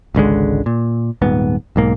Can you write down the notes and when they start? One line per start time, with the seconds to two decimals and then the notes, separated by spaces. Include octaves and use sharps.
0.15 G#1 C#2 D3 G#3
0.66 A#2
1.22 D#1 G#2 B3
1.76 B1 G#2 A#3